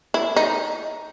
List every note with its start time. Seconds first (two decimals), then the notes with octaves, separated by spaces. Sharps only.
0.14 E4
0.36 D#4